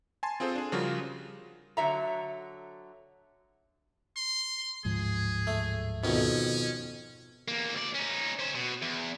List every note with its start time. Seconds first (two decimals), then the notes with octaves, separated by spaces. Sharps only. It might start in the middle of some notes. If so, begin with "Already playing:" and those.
0.23 G#5 A5 C6
0.40 C4 F4 G#4 A4 C5
0.55 D4 G#4
0.72 C#3 F3 G3 F4 F#4 A#4
1.77 D3 F#3 E5 A#5
4.16 C6
4.85 D1 G#2 F3 G#4
5.47 A3
6.04 F2 B2 D#3 C#4
7.48 E2 A#3
7.74 D2 D5
7.95 C#4 D#4
8.39 C#4 C5
8.55 B2
8.82 E2